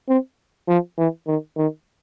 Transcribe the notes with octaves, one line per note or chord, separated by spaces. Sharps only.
C4
F3
E3
D#3
D#3